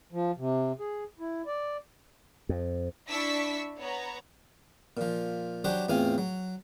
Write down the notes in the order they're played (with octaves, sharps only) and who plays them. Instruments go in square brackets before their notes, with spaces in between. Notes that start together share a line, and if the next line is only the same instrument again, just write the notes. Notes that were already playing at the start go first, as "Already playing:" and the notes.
[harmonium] F3
C3
G#4
E4
D5
[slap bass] F2
[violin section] D4 E4 C#6 E6 B6
B3 C#5 A#5
[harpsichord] A#2 F3
F#3 D4 F#4 G4 C5
E2 A2 C4 F4 F5 G#5
F#3